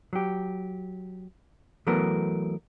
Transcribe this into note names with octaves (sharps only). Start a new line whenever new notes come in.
F#3 G4
E3 F#3 A3 B3 A#4